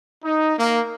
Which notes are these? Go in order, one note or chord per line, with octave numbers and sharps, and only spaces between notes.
D#4
A#3